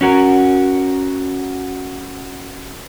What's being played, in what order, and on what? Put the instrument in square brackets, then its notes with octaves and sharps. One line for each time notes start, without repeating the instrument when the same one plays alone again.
[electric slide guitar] C#4 F#4 A#4